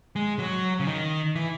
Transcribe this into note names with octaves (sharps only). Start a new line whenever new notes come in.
G#3
F#3
C#3
D#3
E3